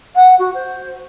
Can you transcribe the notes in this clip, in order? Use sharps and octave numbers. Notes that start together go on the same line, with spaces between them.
F#5
F#4
C5